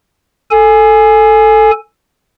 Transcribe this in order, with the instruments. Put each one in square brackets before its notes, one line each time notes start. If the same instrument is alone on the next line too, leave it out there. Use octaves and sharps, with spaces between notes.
[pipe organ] A4 G#5